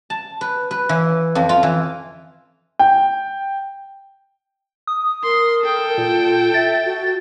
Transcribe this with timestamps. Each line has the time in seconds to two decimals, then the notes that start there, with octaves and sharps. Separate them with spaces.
0.10 A5
0.41 B4
0.71 B4
0.89 E3
1.35 F2
1.49 F4
1.63 E3
2.79 G5
4.87 D#6
5.24 A#4 C6
5.62 A4 G5
5.98 A#2 F4
6.54 E5 A6
6.85 F#4